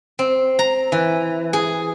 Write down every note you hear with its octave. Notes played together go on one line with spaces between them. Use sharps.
C4
A#5
E3
G#4